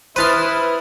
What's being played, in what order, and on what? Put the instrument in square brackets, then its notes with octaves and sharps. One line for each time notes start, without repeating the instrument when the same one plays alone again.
[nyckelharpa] E4 [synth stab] B4 D#6 F6 [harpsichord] C5 A5 C6